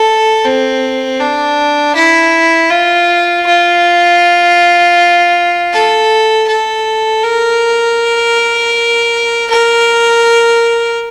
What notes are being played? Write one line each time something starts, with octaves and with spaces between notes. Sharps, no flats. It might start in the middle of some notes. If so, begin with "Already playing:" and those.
Already playing: A4
C4
D4
E4
F4
F4
A4
A4
A#4
A#4